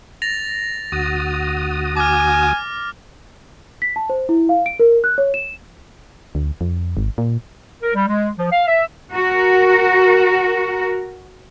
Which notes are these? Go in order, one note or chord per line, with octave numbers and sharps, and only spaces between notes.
A6 A#6 F7
D2 F#4 D#6
G#5 D6 F6
B6
A5
C5
E4
F5
D7
A#4
F#6
C#5
E7
D2
F2
G#1
A#2
A#4
G3
G#3
F3
F5
E5
F#4 A#4